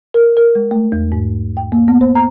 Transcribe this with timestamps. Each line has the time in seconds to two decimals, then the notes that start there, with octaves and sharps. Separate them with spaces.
0.14 A#4
0.37 A#4
0.55 G#3
0.71 A3
0.92 E2
1.12 G#2
1.57 G5
1.72 A#3
1.88 B3
2.01 C5
2.15 A#5